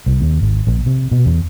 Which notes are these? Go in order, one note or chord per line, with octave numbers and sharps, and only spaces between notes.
C2
D#2
G#1
A#1
C3
B2
E2